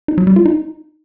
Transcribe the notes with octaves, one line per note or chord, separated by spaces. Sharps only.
D#4
F#3
G3
F4
D#4